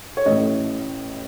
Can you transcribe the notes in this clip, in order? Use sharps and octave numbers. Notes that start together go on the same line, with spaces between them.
C#5
A1 A2 D#5